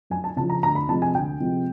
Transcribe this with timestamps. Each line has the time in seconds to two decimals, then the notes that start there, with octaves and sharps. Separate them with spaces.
0.10 F#2 G#5
0.24 A5
0.36 C#3 F3 A5
0.50 A#5
0.63 D2 A#5
0.75 B5
0.88 C3 F3 G#3 A5
1.02 G#5
1.15 D2 G5
1.40 C3 F3 G#3